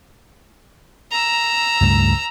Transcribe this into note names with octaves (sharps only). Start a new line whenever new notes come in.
A#5 E6
C#2 G2 A3